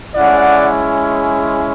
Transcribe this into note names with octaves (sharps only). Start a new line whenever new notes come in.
G#3 C#4 E4 D5 F#5